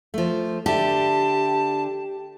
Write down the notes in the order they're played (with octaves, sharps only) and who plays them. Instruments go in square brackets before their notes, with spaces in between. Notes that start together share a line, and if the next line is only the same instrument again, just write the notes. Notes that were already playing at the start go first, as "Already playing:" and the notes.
[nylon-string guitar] F3 A3
[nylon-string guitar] D3 E5 [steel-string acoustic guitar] G4 [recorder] A5